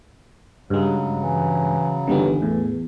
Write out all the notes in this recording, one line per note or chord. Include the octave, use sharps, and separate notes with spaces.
G2 C#3 F#3 G#3
E3
G1 D#3 E3 G3 B3
E2 A2